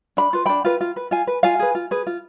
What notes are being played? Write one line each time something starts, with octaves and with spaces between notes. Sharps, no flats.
D4 B5
F4 B4
D4 G5 B5
F4 B4
F4
B4
F4 F5 G#5
B4
F4 F5 G#5
G#4 B4
F4
G#4 B4
F4